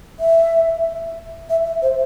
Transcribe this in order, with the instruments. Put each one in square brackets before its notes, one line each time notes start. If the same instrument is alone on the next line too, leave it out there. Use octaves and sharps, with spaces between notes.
[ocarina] E5
E5
E5
C5